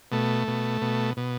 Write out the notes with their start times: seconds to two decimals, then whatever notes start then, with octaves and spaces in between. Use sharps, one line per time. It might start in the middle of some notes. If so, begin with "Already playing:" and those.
0.12 B2 A3
0.48 B2
0.81 B2
1.17 B2